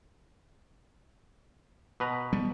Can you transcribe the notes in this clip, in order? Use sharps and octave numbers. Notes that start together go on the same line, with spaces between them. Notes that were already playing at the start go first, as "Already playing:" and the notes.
B2 B4 A#5
G3 B3